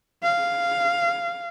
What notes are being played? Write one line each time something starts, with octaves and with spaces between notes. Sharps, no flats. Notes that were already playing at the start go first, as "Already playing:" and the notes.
F5